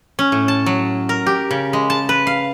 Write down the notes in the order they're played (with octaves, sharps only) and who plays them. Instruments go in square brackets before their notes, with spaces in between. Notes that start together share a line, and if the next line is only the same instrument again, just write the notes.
[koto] C#4
A2
A5
F#3
A#4
G4
C#3
G#3
A5
B4
F5